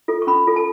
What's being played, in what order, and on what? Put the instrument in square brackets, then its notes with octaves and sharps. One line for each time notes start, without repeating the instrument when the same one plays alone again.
[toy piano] F4 A4
C#6
C#4 B5
F4 A4
A5